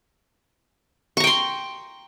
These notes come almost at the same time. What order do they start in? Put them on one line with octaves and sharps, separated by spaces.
C#6 A#5 G5 C6